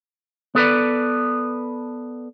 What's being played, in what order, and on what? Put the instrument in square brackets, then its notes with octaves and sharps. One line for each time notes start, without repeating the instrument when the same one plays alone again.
[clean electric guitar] B3 A4 B4 D5